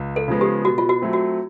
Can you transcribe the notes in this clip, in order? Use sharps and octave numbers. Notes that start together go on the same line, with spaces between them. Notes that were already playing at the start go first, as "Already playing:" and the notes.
Already playing: C#2
A4
C#3 F3 G#3 B3
G4
B2 F#4
F4
F#4
F#3 A3 C4
F#4